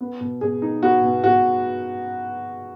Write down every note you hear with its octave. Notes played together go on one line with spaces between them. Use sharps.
B3
B2
B2 G#4
D#4
B3 F#4
B2
B2 F#4